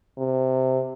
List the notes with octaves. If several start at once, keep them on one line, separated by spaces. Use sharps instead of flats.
C3